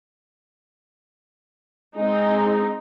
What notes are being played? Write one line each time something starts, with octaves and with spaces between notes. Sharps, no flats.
G#3 C4 D#4